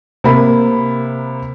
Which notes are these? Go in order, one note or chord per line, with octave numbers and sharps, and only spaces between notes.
C3 A#3 B5